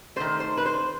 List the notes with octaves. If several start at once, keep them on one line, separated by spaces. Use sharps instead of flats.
D#3 A3 C5
C5
B4
C5